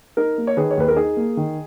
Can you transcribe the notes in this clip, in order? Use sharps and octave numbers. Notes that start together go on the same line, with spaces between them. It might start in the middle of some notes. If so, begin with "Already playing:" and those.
D#4 A#4
A#3
C#5
D#3 G#4 B4
C#5
D#2 B4
A#4
D#4 G#4
A#3
D#3